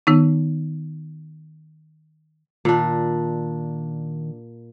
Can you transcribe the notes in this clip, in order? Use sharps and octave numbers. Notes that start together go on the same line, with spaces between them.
D#3 B3 D#4
A#2 D#3 D4